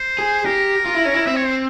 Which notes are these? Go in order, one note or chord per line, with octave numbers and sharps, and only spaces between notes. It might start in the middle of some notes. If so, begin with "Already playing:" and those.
Already playing: C5
G#4
G4 A#4
F4
E4
C#4
E4
C4 E5
C#5
C5